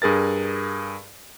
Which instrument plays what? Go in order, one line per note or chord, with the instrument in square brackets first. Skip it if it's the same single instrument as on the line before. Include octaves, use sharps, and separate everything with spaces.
[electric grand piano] G2 G#4 A#4 A6